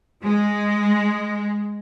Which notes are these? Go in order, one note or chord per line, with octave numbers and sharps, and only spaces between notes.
G#3